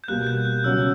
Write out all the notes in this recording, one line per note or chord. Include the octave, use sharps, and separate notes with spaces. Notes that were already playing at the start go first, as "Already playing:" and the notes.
G6
B2 G3 A#3 F#6
G6
F#6
C#3 F#3 C#4 F#4 E6